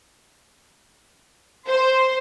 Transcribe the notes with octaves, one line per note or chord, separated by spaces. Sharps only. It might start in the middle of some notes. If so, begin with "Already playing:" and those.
C5